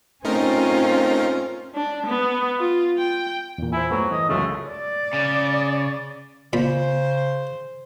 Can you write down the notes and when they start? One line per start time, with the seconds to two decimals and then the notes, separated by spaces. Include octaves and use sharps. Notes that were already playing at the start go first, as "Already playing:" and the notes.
0.25 A3 C4 C#4 D#4 F4 A#4
1.75 D4
2.06 B3
2.59 F4
2.98 G5
3.58 E2 A#2
3.73 E4 C5 G#5
3.91 G2 F#3 A3 B3
4.11 E3 D#5
4.29 C#2 F#2 C#3 A3
4.70 D5
5.13 C#3
6.53 A#2 C#3 C5 B5